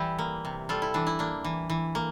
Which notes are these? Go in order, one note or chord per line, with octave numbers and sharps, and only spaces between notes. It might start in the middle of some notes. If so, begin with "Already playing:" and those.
Already playing: E3 G3 E4 G4
A#3
C3
G3 F4 A4
E4
E3 D4
E4
A#3 D4
E3
E3
A#3